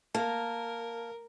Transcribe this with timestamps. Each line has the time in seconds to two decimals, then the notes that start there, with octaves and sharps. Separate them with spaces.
0.15 A#3 A#4 A5